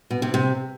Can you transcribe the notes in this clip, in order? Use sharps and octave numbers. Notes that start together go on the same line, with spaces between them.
B2
C3
C3